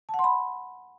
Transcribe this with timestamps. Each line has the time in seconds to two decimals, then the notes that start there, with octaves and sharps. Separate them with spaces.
0.09 A5
0.14 F#5
0.19 C6
0.24 B5